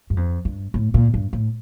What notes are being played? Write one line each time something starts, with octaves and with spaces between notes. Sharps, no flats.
G2
F2
G2
A2
A#2
G2
A2